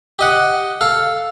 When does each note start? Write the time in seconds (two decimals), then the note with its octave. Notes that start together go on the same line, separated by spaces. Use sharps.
0.19 G4 D#5 F#5
0.81 A4 F5